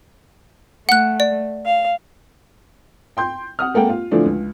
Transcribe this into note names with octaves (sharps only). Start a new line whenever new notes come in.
A3 F#5 F#6
D5
F5
G5 C6 G6
F#5 D#6 F6
G#3 A#3 A4 F#5 G5
F4 F5
A2 D3 E3 F3 A3 D4
C#2